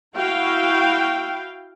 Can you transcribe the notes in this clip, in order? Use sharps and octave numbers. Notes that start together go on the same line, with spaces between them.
E4 F#4 F5 G5